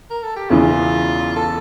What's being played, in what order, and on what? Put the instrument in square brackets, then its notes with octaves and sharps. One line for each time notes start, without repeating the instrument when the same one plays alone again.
[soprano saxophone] A#4
A4
G4
[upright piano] E1 E2 C#3 E3 [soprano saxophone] F4
[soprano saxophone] A4